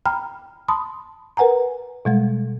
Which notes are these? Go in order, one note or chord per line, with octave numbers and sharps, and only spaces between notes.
G5 A#5 B5 F6
A5 B5 C6 D#6
A#4 B4 F#5 G#5 A#5
B2 G3 G#3